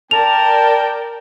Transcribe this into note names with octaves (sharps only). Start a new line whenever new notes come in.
A#4 D5 G5 A5 F7